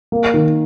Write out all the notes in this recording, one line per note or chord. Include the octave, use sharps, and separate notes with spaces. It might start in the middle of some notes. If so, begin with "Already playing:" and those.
A#3
D#3